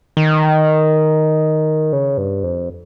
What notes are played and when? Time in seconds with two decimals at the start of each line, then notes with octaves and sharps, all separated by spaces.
0.17 D#3
1.93 C#3
2.18 G2
2.43 F2